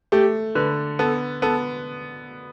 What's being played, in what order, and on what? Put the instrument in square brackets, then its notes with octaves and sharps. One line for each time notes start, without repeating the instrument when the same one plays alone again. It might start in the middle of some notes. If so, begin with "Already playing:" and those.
[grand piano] A3 [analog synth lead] G4
[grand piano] D3 [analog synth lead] B4
[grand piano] B3 [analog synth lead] A4
[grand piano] B3 [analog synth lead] A4